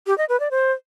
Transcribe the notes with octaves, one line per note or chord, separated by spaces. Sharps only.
G4
D#5
B4
D5
C5